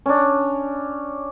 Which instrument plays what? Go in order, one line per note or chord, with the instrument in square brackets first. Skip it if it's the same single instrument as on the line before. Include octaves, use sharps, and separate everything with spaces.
[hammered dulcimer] C#4 D4